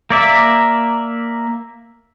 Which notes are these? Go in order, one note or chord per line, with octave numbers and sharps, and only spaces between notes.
A#3 D5 E5